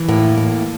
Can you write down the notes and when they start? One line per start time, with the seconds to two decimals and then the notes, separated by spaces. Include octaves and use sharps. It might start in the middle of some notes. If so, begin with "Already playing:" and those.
Already playing: E3
0.09 A2 A#3
0.38 A2